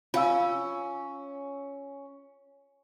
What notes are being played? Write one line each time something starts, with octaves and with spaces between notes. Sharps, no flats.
C#4 F4 F5 E6